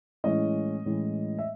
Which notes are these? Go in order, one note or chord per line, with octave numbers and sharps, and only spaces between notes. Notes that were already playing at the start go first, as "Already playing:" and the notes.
A2 E3 G#3 C#4 D#5
A2 E3 G#3 C#4
E5